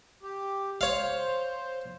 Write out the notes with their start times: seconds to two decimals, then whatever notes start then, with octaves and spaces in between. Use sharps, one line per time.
0.23 G4
0.81 C5 C#5 F5